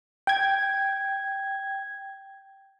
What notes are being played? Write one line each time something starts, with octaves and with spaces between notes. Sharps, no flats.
G5 G#6